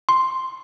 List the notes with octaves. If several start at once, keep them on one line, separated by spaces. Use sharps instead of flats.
C6